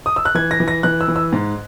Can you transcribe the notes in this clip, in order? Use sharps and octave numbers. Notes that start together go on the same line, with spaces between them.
D#6
E6
F#6
E3 G#6
A#6
E3
A#6
E3 F#6
E6
E3
E6
G#2